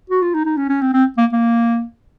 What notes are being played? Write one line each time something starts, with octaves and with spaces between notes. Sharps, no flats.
F#4
F4
D#4
D#4
C#4
C#4
C4
C4
A#3
A#3